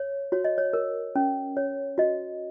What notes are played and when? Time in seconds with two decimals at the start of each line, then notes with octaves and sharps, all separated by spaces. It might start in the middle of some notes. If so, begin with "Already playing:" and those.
Already playing: C#5
0.32 F#4 C#5
0.45 D#5
0.58 C#5
0.73 A#4
1.15 C#4
1.57 C#5
1.98 F#4 D#5